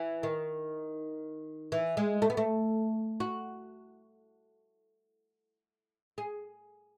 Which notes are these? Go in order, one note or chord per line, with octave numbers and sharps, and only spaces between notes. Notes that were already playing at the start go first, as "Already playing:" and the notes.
Already playing: E3
D#3
E3
G#3
A3
B3
A3
F#4
G#4